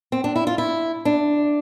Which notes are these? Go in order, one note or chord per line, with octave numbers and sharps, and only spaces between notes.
C4
D4
E4
F4
E4
D4